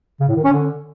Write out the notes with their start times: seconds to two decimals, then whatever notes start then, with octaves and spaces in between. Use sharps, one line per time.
0.20 C#3
0.28 A2
0.36 D#3
0.44 C#4
0.52 D3